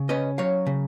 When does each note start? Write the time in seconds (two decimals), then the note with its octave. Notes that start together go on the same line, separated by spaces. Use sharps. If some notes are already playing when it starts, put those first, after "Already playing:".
Already playing: C#3
0.09 C#4 B4 D#5
0.38 F#3 C#5 F5
0.67 C#3